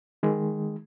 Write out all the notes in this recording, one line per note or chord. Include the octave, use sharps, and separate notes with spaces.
D#3 G#3